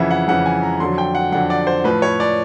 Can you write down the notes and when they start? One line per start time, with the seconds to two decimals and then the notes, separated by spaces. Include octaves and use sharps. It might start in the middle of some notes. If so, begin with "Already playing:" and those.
Already playing: F2 C#3 E3 E5 F#5
0.11 F#5
0.28 F2 C#3 E3 F#5
0.46 G#5
0.63 A#5
0.80 F2 D3 F#3 C6
0.98 G5
1.15 F#5
1.32 F2 D3 F#3 F#5
1.50 D5
1.67 C5
1.84 A2 F3 B4
2.02 C#5
2.20 D5